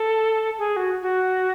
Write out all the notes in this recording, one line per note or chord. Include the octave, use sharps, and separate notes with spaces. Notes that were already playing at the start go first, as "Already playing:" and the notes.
Already playing: A4
G#4
F#4
F#4